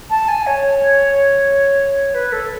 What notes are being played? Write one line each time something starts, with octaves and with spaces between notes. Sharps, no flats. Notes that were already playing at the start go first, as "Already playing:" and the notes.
A5
G#5
C#5
B4
A4